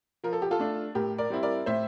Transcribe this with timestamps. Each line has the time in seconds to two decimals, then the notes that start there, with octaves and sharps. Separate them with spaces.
0.24 F3 A#4
0.33 A4
0.42 G4
0.51 F4 A4
0.59 A3 D4
0.95 A2 G4 A#4
1.18 A#4 D5
1.30 G3 C4 E4
1.43 A#4 D5
1.66 A2 C5 E5